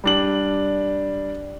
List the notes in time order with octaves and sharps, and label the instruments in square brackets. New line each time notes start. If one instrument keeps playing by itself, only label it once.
[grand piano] G3 D4 F#7